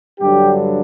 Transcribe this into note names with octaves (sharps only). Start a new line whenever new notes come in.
G2 D3 F#3 G4